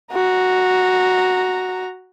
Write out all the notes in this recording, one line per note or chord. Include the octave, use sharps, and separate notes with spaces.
F#4 A#5